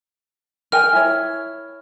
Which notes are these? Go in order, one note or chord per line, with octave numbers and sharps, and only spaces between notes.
A#4 G5 G#5 F6
E4 C#5